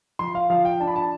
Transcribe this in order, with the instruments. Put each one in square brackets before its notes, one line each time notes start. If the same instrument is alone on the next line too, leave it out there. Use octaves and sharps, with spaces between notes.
[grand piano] F3 C6
F5
F3 F5
G5
D4 A5
B5
A5